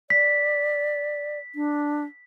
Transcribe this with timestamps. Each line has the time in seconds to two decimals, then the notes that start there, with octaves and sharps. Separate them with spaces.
0.10 D5 B6
1.55 D4